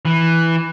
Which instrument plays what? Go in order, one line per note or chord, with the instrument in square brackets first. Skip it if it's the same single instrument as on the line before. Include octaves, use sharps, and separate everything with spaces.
[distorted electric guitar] E3